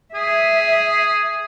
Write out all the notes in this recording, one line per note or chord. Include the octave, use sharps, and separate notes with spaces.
G#4 E5